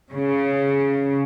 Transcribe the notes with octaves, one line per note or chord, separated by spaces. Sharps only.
C#3